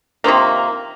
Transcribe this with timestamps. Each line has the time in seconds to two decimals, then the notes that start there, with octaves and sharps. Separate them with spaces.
0.24 C3 D#3 F3 A#3